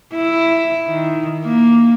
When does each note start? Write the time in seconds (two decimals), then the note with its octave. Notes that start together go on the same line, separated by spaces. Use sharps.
0.13 E4
0.87 D#3
1.45 A#3